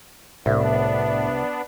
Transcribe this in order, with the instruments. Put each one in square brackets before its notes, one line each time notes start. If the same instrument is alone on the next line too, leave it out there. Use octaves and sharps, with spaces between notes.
[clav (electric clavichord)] C2 [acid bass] A2 [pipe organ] B3 D4 [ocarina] E5